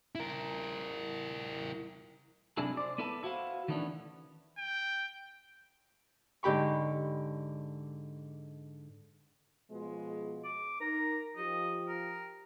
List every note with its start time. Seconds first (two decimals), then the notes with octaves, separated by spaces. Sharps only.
0.15 E4 A#4
2.57 C3 F#3 D4 E4 G#4 A4
2.77 C5 D5
2.98 B3 E4 A4 B4 A5
3.23 E4 F#4 C5 F5
3.68 D#3 E3 A3 B3 C#4 D4
4.58 G5
6.43 G#2 D3 G4 B5 C#6
9.71 B2 F3 G#3
10.44 D6
10.81 D#4 A#4 A#5
11.37 F3 G4 D#5
11.89 A#4